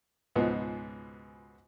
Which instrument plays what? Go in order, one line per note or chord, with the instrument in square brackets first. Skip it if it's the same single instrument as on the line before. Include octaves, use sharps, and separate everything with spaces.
[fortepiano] C#2 G#2 B2 F3 B3